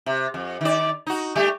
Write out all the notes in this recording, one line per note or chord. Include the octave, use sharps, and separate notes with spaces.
C3
F2
D#3 D5
D#4 F#4
G3 A3 G4